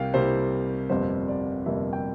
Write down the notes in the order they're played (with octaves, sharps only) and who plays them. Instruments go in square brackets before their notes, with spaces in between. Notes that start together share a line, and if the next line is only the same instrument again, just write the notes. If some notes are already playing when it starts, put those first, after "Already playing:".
Already playing: [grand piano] C2 C3 G3 A#3 F5 G5
C2 C3 G3 A#3 C5
G1 F2 C3 G3 A#3 C5
D5
G1 F2 C3 G3 A#3 E5
G5